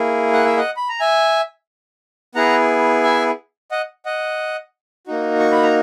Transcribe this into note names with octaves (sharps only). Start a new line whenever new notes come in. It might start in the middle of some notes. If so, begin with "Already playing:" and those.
Already playing: A#3 E4 G#4
F#5
E5
D#5 F#5
B5
A#5
E5 G#5
B3 E4 G#4 F#5 A#5
E5 G#5
D#5 F#5
D#5 F#5
A#3 D#4 F#4
C#6
B5
A#5